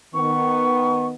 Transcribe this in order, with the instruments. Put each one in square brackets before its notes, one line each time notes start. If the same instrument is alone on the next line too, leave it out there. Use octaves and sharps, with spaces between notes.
[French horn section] D#3 B3 [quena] C#6